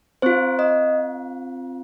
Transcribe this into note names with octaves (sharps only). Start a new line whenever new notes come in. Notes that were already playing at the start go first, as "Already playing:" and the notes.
C4 F4 C5
D#5